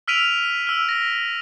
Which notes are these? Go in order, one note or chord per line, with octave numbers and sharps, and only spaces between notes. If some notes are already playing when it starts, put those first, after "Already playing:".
E6 F6 B6 D7 D#7 F7
E6 F6
A#6